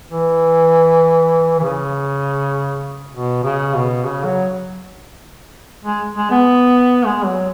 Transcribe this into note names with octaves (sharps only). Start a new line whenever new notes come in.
E3
E3
C#3
B2
C#3
B2
C#3
F#3
G#3
G#3
B3
G#3
F#3